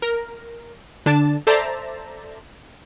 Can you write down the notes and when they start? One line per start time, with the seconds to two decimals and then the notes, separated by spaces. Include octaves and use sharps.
0.02 A#4
1.06 D3 D4 A5
1.47 A4 C5 D5 E5 A5 A#5